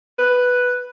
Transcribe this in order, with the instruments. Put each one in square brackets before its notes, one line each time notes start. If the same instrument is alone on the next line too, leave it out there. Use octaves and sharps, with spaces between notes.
[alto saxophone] B4